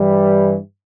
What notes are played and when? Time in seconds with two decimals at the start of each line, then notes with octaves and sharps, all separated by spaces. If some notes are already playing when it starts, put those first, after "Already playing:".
Already playing: G2 E3 G3